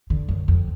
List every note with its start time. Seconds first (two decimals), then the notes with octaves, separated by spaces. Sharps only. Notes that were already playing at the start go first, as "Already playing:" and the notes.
0.10 D3
0.28 F#2
0.48 F2